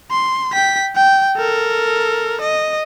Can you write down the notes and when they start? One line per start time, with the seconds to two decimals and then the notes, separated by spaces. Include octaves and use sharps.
0.11 C6
0.53 G5 B6
0.96 G5
1.37 A4 A#4
2.41 D#5